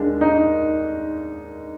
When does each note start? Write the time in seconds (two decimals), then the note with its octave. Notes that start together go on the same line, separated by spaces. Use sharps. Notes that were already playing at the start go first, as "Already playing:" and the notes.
Already playing: D#2 D#3 G#3 D4
0.21 D#4